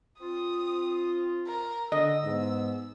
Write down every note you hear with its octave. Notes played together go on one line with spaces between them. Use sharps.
C4 F4 D#6
A#4
D3 D#5 E6
G#2 B3